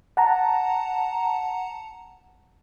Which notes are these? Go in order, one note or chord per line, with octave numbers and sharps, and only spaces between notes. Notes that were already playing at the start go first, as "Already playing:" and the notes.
F#5 A5 A#5